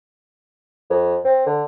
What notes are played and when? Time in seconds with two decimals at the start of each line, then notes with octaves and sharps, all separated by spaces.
0.90 F2
1.24 C4
1.46 D3